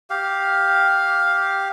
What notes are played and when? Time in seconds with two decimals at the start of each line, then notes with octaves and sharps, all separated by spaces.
0.10 G4 F5